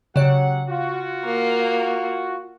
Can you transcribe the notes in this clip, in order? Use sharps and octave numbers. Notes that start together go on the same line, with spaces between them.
C#3 F#3 G4 C#5 F#5
F4 F#4
A#3